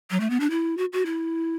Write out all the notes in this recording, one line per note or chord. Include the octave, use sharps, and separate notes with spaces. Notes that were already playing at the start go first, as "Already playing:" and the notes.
F#3
A3
B3
D4
E4
F#4
F#4
E4